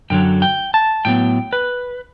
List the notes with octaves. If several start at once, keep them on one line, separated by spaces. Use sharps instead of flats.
F#2 D3 F#3 G5
G5
A5
A2 F#3 B3 G5
B4